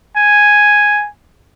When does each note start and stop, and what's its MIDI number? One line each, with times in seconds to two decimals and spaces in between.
0.16 1.08 80